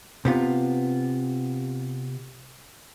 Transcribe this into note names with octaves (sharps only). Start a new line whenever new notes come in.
C3 B3 F4